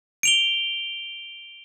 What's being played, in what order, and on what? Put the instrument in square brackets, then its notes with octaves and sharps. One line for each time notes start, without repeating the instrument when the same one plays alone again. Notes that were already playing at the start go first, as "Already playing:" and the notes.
[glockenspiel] D7 F7 G7